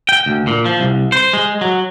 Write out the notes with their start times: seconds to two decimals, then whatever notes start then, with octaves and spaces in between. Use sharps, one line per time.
0.09 G5
0.26 D2
0.47 A#2
0.66 F3
0.80 C2
1.12 C5
1.33 G#3
1.61 F#3